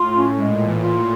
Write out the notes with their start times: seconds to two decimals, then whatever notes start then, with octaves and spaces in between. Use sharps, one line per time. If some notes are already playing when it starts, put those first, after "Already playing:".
Already playing: A2 F4
0.15 C#4
0.38 A#2 G#3
0.62 E3
0.84 A#2 F4